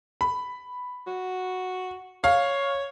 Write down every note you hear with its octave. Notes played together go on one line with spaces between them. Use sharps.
B5
F#4
C#5 F5